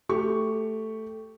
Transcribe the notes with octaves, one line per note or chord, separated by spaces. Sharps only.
A3 G4 C#6